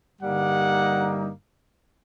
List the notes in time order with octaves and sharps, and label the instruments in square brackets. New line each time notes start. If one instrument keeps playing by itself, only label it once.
[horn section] G2 D3 G3 A#3 D#4 F#5